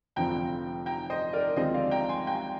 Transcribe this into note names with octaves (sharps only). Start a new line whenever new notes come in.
F1 F2 D3 F3 C4 G5 A#5
G5 A#5
C5 D#5
A#4 D5
D#2 D3 F3 G#3 C4 C5 D#5
D5 F5
G5 A#5
G#5 C6
G5 A#5